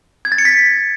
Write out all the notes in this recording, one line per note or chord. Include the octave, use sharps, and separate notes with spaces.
G#6
A6
C#7
B6